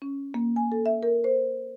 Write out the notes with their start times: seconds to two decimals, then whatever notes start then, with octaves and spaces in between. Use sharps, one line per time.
0.02 C#4
0.34 A#3
0.56 G#5
0.72 A4
0.86 E5
1.03 A#4
1.24 C5